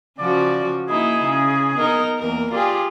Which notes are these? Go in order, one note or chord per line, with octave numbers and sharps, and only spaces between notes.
C#3 F3 F#4 D5
A#3 D#4 E4 G#4
C#3
B3 D#4 A#4
E2 A#3 A#4
F4 G4 G#4 D5